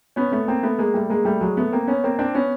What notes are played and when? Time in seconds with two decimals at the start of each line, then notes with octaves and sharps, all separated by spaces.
0.16 B3 C#4
0.32 A3 B3
0.48 A#3 C4
0.63 A3 B3
0.78 G#3 A#3
0.94 G3 A3
1.10 G#3 A#3
1.25 G3 A3
1.41 F#3 G#3
1.57 A3 B3
1.72 A#3 C4
1.87 B3 C#4
2.04 A#3 C4
2.19 C4 D4
2.35 B3 C#4